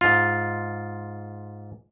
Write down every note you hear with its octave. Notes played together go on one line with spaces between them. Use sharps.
G#2 F4